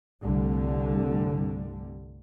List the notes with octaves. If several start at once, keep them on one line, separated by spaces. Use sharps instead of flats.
C2 G2 D3 G3 A3